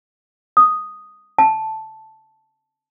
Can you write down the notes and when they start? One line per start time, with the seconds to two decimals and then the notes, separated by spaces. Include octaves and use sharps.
0.57 D#6
1.38 A5